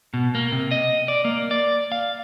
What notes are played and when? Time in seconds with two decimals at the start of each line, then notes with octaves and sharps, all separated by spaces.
0.14 B2
0.35 A#3
0.52 C3
0.71 D#5
1.08 D5
1.25 A#3
1.51 D5
1.92 F5